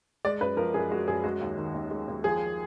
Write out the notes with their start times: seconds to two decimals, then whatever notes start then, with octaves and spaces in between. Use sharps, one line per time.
0.25 G#3 D5
0.41 F#2 B4
0.57 F3 A#4
0.74 F#2 G#4
0.91 G#3 F#4
1.07 F#2 G#4
1.24 G#3 F#4
1.41 D#2
1.58 D#3
1.74 D#2
1.91 G#3
2.08 D#2
2.24 F3 G#4